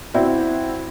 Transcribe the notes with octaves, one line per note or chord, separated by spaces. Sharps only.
C4 E4 F#4 D5